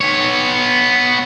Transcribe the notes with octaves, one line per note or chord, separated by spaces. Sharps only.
B3 C#5